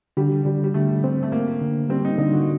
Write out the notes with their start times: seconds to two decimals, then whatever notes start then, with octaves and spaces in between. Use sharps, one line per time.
0.17 D3 G3
0.45 D3 G3
0.64 G3
0.74 D3 A3
1.04 C4
1.23 A3
1.32 D3 A#3
1.61 D3
1.90 G3 C4
2.05 D#4
2.18 D3 D#4
2.33 F#4